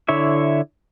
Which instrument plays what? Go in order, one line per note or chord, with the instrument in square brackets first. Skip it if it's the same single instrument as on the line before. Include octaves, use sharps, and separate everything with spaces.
[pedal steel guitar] D3 E4 C#5 E5